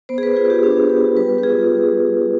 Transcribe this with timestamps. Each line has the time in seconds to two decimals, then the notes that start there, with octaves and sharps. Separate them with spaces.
0.09 B3 C5
0.18 G#4
0.23 B4
0.36 F4 G#4
0.50 G4
0.63 D4 G#4
0.89 B3 G4
1.16 G3 B4
1.38 G4
1.43 F4 G#4